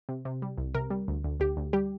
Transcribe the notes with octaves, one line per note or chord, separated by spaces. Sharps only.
C3
C3
G3
C2
C3 A#4
G3
D2
D2
D2 G4
D2
G3 G4